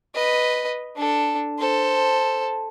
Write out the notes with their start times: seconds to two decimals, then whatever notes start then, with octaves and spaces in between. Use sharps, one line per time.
0.15 B4 D#5
0.96 D4 A4
1.59 A4 C5